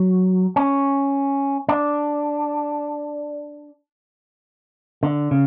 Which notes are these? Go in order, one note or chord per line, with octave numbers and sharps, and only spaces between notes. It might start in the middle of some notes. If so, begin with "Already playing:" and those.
Already playing: F#3
C#4
D4
D3
C#3